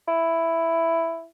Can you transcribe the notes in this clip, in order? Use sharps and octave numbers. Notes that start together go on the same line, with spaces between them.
E4